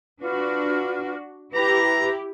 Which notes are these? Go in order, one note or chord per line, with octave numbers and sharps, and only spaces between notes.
D4 F4 F#4 B4
E4 G4 B4 A#5